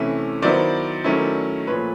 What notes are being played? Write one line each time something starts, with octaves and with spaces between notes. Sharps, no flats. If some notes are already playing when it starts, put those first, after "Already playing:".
Already playing: C3 E3 A3 C#4 E4
D#3 F#3 B3 E4 C5 D5
D#3 F#3 A3 C#4 E4
A#2 F3 A3 B4 C#5